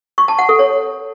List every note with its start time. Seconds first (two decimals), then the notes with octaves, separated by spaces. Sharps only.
0.18 C#6
0.28 A5
0.39 F#5
0.49 A4
0.59 C#5